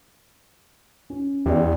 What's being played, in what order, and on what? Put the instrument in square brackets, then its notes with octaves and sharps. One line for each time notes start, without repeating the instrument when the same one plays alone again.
[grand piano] C#4
[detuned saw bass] E2 [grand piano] G4 D5